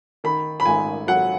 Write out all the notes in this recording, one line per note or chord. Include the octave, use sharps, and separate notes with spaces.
D#3 B5
B5
G#1 G#5
F#3 F#5